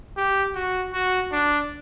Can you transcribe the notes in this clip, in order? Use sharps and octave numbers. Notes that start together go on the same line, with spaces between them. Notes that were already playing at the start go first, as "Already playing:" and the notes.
G4
F#4
F#4
D4